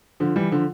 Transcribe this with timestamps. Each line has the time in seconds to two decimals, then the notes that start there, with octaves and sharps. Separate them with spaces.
0.20 D3 F3
0.36 E3 G3
0.51 D3 F3